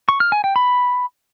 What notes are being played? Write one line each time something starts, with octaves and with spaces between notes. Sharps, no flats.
C#6
F6
G#5
G5
B5